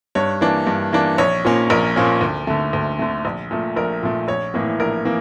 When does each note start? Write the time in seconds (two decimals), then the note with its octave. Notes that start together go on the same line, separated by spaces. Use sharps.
0.15 G2 C#5
0.41 E3 A#3 D4
0.67 G2
0.93 E3 A#3 D4
1.18 A#1 C#5
1.44 A#2 F3 A#3 C#4
1.70 A#1 A#4
1.96 A#2 F3 A#3 C#4
2.21 D2
2.47 D3 A3
2.73 D2
2.99 D3 A3
3.25 A#1
3.51 A#2 A3
3.76 A#1 A#4
4.02 A#2 A3
4.28 A#1 C#5
4.54 A2 E3 A#3
4.80 A#1 A#4
5.05 E3 A#3